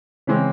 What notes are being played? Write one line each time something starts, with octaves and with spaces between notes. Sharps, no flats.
C#3 E3 G#3 C4